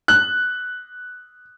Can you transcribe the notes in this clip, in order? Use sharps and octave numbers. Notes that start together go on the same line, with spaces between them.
F#6